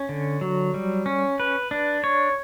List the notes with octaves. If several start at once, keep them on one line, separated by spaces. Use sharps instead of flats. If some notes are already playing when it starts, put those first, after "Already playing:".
Already playing: C#4
D3
F#3
G3
C#4
B4
D4
C#5